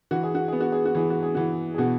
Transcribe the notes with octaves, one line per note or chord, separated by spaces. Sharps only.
E3 F#4
G#4
F#4
B3 G#4
F#4
G#4
F#4
E3 G#4
F#4
G#4
E3 F#4
G#4
B2 F#4